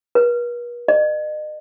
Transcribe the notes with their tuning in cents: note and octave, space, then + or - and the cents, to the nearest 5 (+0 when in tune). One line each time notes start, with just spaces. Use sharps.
B4 -45
D#5 -40